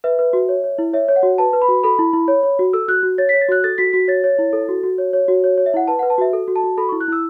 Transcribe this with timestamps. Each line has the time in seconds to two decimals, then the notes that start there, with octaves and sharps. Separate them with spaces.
0.04 B4 E5
0.19 B4
0.33 F#4
0.49 C#5
0.64 C#5
0.78 E4
0.93 C#5 E5
1.08 C#5
1.16 F#5
1.23 F#4
1.38 B4 A5
1.53 B4
1.62 B5
1.68 F#4
1.83 A4 B5
1.99 E4
2.13 E4
2.28 C#5
2.43 C#5
2.59 F#4
2.73 A4 E6
2.88 F#4 F#6
3.03 F#4
3.18 C#5 A6
3.29 C#5 B6
3.41 A6
3.49 F#4 F#6
3.64 A4 A6
3.78 F#4 B6
3.93 F#4 B6
4.08 C#5 A6
4.24 C#5
4.39 E4
4.53 A4
4.69 F#4
4.84 F#4
4.98 C#5
5.13 C#5
5.28 F#4
5.44 C#5
5.58 C#5
5.66 E5
5.74 E4 F#5
5.88 B4 A5
5.99 B4 F#5
6.10 A5
6.18 F#4 E5
6.33 A4
6.48 F#4
6.56 A5
6.64 F#4
6.77 A4 B5
6.89 E4 C#6
7.00 F#6
7.08 E4 E6